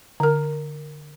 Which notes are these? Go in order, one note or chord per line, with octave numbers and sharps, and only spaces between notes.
D3 A#4